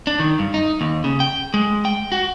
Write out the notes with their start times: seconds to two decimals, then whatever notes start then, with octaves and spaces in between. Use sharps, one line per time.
0.07 D4
0.19 D#3
0.39 G2
0.54 D#4
0.81 D#2
1.04 C#3
1.20 G5
1.54 G#3
1.85 G5
2.12 F#4